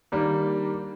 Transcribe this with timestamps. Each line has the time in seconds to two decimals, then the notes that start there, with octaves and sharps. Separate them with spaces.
0.12 D#3 G3 A#3 D4